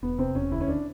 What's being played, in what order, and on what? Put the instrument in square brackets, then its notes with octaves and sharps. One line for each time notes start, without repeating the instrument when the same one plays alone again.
[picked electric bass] E1 [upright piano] B3
[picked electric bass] C3 [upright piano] C4
[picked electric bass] E1 [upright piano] C#4
[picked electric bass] D2 [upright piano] E4
[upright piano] C#4
D4